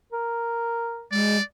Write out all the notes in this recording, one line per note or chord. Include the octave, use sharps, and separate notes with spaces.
A#4
G#3 D5